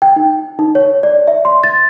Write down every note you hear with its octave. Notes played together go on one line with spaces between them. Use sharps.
G5
D#4
D#4
C#5
D5
E5
C6
A6